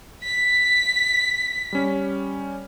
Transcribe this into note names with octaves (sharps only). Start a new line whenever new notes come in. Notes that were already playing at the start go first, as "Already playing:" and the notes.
B6
G3 C#4